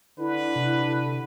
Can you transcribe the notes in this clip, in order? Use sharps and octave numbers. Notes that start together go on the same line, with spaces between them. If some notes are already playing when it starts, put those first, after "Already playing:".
D3 E4 B4
C3